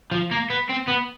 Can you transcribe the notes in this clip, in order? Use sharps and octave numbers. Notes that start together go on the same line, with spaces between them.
F3
A#3
B3
C4
B3